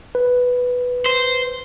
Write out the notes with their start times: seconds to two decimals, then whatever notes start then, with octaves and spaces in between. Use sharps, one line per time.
0.15 B4
1.06 C5